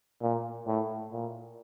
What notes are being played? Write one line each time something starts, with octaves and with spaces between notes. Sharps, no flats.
A#2
A2
A#2